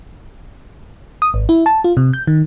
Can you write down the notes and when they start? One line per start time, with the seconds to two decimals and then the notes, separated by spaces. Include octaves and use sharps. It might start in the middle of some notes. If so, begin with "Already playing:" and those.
1.22 D#6
1.34 G#1
1.49 E4
1.66 A5
1.84 F4
1.97 C3
2.13 G6
2.27 D#3